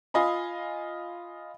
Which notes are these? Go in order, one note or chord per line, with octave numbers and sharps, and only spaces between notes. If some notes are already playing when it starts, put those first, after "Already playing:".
F4 D#5 G#5 B5